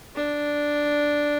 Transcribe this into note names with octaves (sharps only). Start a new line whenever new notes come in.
D4